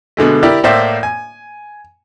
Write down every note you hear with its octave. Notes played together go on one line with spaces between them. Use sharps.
B2 D3 G#3 A3
E4 G4 A#4 D5
A2 A#3 C5 D5 E5
G#5